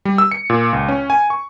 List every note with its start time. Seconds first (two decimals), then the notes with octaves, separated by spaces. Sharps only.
0.05 G3
0.18 E6
0.31 C#7
0.50 A#2
0.73 C#2
0.88 C#4
1.10 G#5
1.30 C#6